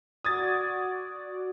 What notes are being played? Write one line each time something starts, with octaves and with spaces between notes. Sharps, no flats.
F#4 D5 D#6 G#6 A6